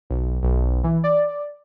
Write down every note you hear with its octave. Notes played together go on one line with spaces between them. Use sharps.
B1
B1
E3
D5